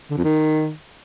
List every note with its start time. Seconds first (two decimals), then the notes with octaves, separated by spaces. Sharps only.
0.10 D3
0.17 F2
0.24 D#3